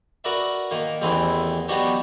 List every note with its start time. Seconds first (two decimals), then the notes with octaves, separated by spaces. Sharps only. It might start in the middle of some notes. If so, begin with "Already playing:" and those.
0.24 F#4 A#4 B4 D5 E5
0.71 D#3 A#3
1.02 A1 E2 D#3 E3 C4
1.69 F#3 B3 D4 D#4 F#4 G4